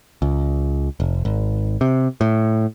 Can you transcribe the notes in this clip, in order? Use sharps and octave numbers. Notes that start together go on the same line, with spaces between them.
C#2
F1
G#1
C3
A2